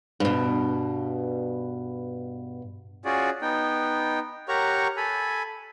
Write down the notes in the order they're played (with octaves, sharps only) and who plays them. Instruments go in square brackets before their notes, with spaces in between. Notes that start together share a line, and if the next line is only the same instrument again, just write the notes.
[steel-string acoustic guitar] G2 B2
[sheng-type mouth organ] C#4 F4 F#4 G#4 D5
B3 D#4 G5
G4 A#4 C#5 F#5 A#5 C#6
A4 G#5 B5